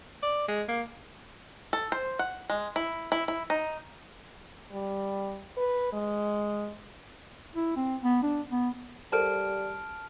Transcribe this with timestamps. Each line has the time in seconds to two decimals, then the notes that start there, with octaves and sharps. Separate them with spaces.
0.23 D5
0.48 G#3
0.69 A#3
1.73 A4
1.92 C5
2.19 F#5
2.50 G#3
2.76 E4
3.12 E4
3.28 E4
3.50 D#4
4.71 G3
5.57 B4
5.93 G#3
7.55 E4
7.76 C4
8.04 B3
8.23 D4
8.51 B3
9.12 G3 A4 A#4 C5 A5 F6 D7